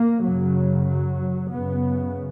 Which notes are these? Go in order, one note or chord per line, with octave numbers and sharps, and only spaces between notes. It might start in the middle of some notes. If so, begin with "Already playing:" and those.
Already playing: A#3
F#2 C#3 F#3
F#3
F#2 C#3 B3